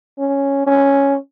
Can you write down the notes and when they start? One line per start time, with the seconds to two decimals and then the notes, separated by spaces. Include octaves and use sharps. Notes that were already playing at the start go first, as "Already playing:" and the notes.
0.18 C#4
0.67 C#4